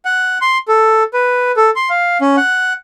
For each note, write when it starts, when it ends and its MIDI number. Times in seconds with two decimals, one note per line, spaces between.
0.05 0.38 78
0.41 0.58 84
0.68 1.03 69
1.14 1.51 71
1.57 1.70 69
1.76 1.89 84
1.90 2.18 77
2.21 2.36 61
2.37 2.73 78